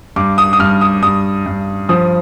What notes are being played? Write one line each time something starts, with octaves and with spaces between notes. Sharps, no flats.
G2 D6
D#6
D#6
G2 F6
D#6
G2 D#6
G2
F3 D#6